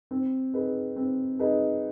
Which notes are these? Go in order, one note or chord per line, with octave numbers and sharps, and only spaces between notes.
C4
D#4 G#4 B4
C4
D#4 G#4 B4